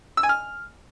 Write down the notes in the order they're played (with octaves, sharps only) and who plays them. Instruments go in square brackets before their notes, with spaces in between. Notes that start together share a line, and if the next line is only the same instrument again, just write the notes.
[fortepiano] E6
G#5
F6